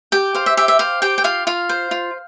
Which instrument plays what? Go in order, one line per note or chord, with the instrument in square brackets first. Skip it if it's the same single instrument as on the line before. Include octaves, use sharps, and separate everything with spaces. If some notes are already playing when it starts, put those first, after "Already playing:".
[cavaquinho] G4 G5
C5 F5
E5
G4 E5
E5
C5 F5
G4 G5
G5
F4 F5
F4 F5
C5
F4